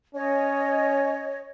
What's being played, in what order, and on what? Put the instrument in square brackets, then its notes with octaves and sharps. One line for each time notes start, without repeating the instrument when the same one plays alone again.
[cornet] C#4 [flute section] C#5 D#5